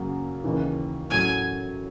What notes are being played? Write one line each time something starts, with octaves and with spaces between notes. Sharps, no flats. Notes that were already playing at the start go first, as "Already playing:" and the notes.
Already playing: F#2 C#3 F#3 A#3
D#2 C#3 E3
A2 F#3 A3 C#4 G#5